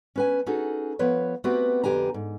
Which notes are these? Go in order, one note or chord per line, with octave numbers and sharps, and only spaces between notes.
C#4 B4 G#5
C#4 D#4 F#4 G#4 A4
F3 B3 B4 C#5
A3 B3 C4 F#4 G4 B4
F2 D3 G4 B4 G#5 A#5
G#2